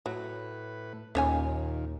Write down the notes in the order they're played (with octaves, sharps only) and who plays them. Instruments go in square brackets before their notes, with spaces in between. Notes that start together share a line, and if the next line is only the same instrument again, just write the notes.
[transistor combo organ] A2 B4 [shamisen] F#3
[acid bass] D#2 [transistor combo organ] A#2 D#3 [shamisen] C#4 C#5 G#5